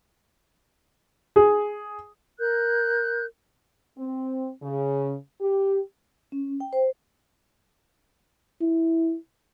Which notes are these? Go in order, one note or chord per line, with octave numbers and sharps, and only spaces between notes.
G#4
A#4 F#6 G6
C4
C#3
G4
C#4
G5
C5
E4